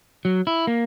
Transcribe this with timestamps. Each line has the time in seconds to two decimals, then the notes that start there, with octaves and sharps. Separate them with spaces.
0.25 F#3
0.47 E4
0.67 A#3